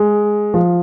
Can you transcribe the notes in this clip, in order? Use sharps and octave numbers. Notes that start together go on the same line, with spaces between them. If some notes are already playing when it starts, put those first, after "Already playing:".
Already playing: G#3
F3